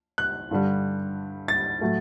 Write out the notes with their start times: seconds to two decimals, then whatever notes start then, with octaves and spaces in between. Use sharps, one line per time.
0.18 F#6
0.51 G2 D3 G3
1.48 A6
1.81 A2 F#3 A3